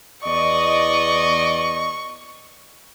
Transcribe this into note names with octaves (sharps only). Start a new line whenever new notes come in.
E2 D5 D#5 C#6